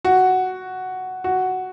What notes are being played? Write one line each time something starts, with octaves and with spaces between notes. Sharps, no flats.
F#4
F#4